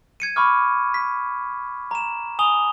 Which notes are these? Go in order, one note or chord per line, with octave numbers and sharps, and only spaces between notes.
G#6 C#7 D#7
B5 C#6 D6 F6
B6
A#5 E7
G#5 D#6 F7 G7